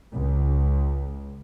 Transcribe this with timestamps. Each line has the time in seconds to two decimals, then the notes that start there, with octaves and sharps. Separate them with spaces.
0.13 C#2